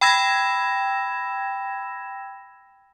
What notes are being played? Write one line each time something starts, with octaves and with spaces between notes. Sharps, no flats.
G5 B5 E6 G#6 A#6 E7